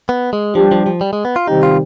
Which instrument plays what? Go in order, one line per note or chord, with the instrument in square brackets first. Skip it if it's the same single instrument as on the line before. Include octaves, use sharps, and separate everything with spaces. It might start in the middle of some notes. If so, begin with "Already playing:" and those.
[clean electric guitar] B3
G#3
[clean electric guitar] F3 [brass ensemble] G3 D4 G4
[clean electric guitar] F3
F3
G3
G#3
B3
F4
[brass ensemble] C3 D#3 G3 C4 G4 [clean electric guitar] D#4
[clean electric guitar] F4